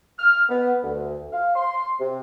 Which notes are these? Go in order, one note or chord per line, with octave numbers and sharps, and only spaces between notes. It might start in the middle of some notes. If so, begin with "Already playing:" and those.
F6
B3
D2
F5
C6
C3